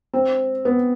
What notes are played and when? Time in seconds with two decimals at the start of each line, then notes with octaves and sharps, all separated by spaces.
0.13 C4
0.65 B3